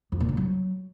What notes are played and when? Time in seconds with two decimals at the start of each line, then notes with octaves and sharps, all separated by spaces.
0.12 F2
0.20 A#2
0.29 D3
0.37 F#3